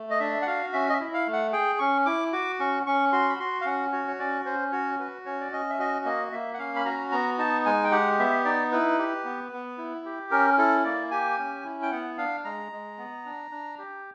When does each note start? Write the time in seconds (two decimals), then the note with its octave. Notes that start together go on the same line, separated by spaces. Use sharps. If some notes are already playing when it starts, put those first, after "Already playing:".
Already playing: A3
0.10 D#5
0.20 D4 E5
0.42 F#5
0.47 F#4 F5
0.73 C#4 E5
0.89 D#5
0.94 E5
1.00 E4
1.14 F5
1.27 A3
1.33 F#5
1.52 G#4 G5
1.79 C#4 C#6
2.06 E4 D6
2.33 F#4 D6
2.60 C#4 C#6
2.86 C#4 C#6
3.12 F#4 C6
3.29 B5
3.40 F#4 C6
3.61 F5
3.65 C#4 F#5
3.92 F#4 C#5
4.08 C#5
4.19 C#4 D5
4.45 C#4 C5
4.72 F#4 C#5
4.99 F#4 B4
5.26 C#4 C#5
5.41 D5
5.52 C#4 D#5
5.70 E5
5.79 F#4 D#5
6.05 A#3 D#5
6.32 A#3 E5
6.54 F#5
6.59 C#4 F5
6.76 B5
6.85 F#4 A#5
7.12 B3 A#5
7.38 D#4 A5
7.66 G#3 G#5
7.84 G5
7.91 G4 F#5
8.19 B3 E5
8.45 D#4 D5
8.72 E4 B4
8.99 G4
9.25 B3
9.52 B3
9.78 E4
10.05 G4
10.31 C#4 A#4
10.58 E4 A4
10.85 A#3 D5
11.11 G4 G#5
11.38 C#4
11.64 E4
11.82 G5
11.92 B3 F#5
12.17 D4 F5
12.44 G#3 A#5
12.72 G#3
12.98 B3
13.25 D4
13.51 D4
13.78 G4